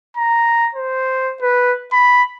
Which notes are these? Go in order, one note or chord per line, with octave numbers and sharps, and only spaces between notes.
A#5
C5
B4
B5